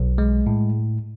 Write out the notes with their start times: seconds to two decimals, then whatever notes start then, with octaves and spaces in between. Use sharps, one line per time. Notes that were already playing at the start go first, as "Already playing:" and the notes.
Already playing: B1
0.18 G#3
0.46 A2